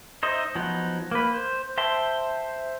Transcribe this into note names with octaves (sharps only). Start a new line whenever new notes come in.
D#4 C5 D#5 E5
F3 F#3 B3 D#4
A#3 B4
C5
C5 E5 G5 A5 C6